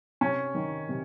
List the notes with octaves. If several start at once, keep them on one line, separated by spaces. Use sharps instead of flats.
C3 C#4
D#3
C3